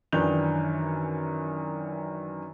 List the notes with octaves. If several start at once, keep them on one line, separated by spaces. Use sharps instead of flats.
F#2 D#3 E3 D4 G6 F7